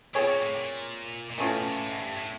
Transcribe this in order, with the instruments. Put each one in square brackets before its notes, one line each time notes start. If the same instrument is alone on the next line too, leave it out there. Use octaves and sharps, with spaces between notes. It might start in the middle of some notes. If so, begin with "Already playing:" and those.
[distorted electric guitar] B2 [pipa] C4 F4 G#4 C#5
[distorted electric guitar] A#2
A2
A#2
A#2
[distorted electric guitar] A2 [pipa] E3 A3 C#4 F4
[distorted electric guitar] B2
A#2
A2
G#2
G2
A2